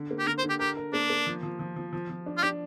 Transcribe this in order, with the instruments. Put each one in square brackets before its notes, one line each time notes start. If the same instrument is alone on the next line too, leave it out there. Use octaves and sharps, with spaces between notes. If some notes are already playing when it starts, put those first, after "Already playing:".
Already playing: [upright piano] D3
A#3
[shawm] G4
[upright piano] D3 [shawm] A#4
[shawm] C5
[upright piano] D3
[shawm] G4
[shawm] G4 [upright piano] A#4
[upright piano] A#4
[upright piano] A#3 [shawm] D4
[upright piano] A#3
F3
F3
F3
F3
F3
F3
D4
[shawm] F4
[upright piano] D4 [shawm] G4